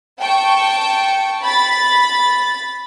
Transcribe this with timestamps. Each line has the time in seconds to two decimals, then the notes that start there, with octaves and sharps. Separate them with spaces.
0.20 G5 A5 C#6
1.43 B5 A6